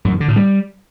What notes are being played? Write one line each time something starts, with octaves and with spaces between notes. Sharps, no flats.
F#2
D#3
D3
A2
G3